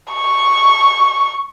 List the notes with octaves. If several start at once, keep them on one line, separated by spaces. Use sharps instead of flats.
C#6